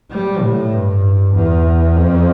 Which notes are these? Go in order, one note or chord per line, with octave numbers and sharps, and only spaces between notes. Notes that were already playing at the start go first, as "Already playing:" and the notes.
G3
A2
G2
E2
F2